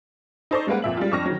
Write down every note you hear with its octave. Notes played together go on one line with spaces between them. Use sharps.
D#4 A4 C5 D5 D#5 C#6
G3 G#3 A#3 B4 F#5
F2 A#2 E5 F#7
G3 G#3 F4
F2 D4 C#6 F6 A#6
D#3 F#3